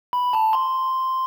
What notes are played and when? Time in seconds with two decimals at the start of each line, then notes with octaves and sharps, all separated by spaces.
0.13 B5
0.33 A5
0.53 C6